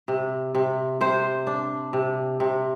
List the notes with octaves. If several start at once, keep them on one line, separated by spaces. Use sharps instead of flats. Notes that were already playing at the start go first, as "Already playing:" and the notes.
C3
C3
C3 C5
D4
C3
C3